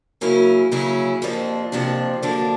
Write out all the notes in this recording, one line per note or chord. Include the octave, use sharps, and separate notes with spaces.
C#3 F#3 A#3 C#4 E4
C#3 F#3 A#3 C#4 E4
F2 C3 F3 A#3 D4
F2 C3 F3 A#3 D4
F#2 D3 F3 A#3 D4